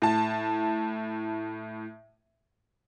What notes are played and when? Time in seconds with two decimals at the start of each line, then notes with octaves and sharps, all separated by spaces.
0.02 A2 A5